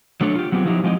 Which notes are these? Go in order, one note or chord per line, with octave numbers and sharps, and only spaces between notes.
F#3 A3 D4 A4 C#5
F4 G4
F#3 B3 C4 E4 G4 G#4
F3 F#3 D#4 E4 G4
F3 G#3 C4 G4 D#5